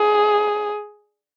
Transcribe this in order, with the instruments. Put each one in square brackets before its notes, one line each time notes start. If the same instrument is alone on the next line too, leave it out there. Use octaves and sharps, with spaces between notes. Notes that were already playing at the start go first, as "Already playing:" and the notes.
Already playing: [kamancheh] G#4